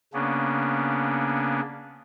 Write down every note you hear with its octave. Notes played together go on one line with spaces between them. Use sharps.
C#3 A#3 B3 C#4 D4